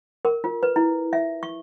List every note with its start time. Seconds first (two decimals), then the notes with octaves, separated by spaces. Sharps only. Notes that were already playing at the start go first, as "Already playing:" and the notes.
0.25 A#4
0.44 F4
0.63 B4
0.76 E4
1.13 E5
1.43 C#6